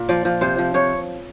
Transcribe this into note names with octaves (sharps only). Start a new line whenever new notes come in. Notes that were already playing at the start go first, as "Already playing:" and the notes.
Already playing: A#2
F3 D5
F3
C3 C5
F3
C3 C#5